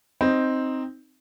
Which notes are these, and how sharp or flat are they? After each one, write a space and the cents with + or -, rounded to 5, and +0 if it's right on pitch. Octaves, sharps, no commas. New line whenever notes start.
C4 +0 D#4 +0